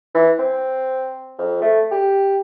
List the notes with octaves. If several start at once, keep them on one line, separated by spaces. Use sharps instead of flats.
E3
C4
F2
A3
G4